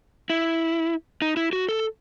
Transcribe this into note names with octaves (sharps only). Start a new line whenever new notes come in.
E4
D#4
E4
F#4
A4